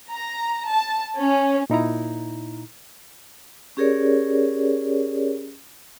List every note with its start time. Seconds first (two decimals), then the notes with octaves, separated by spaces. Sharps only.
0.11 A#5
0.70 A5
1.17 C#4
1.70 A#2 D#4 E4 A#5
3.77 C#4 G4 G#4 A#4 C#5 D5